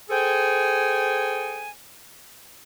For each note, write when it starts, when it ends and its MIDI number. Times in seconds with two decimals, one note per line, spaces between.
0.10 1.70 68
0.10 1.70 69
0.10 1.70 72
0.10 1.70 79
0.10 1.70 80